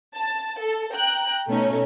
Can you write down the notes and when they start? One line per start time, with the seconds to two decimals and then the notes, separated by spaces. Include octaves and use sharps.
0.14 A5
0.59 A4
0.92 G5 A#5 F#6
1.49 B2 A3 C#4 D#4